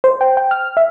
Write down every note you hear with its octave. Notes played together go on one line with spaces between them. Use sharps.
C5
G5
G5
F6
E5